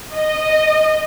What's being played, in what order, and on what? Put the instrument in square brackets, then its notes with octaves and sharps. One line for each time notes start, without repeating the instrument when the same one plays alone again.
[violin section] D#5